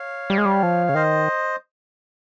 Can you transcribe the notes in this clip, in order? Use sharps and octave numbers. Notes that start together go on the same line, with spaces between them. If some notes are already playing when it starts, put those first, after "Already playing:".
Already playing: C#5 F5
G3
G#3
G3
F3
C#3 C#5
D#3 C5 D#5